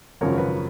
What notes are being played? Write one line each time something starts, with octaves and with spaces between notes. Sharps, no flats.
G#1 F#2 C#3 F3 A#4 C#5
B4